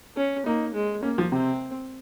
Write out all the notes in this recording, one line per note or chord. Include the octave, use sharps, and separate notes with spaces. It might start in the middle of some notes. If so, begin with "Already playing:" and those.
C#4
A#3 D#4
G#3
A#3 C#4
F3
C3 C4